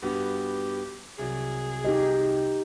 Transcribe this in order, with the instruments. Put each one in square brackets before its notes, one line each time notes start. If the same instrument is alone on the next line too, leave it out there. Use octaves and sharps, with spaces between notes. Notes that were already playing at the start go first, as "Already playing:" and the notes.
[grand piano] G2 B3 F#4 [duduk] G4
[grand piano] C2 F#3 [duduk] G#4
[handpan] D#4 G4 D#5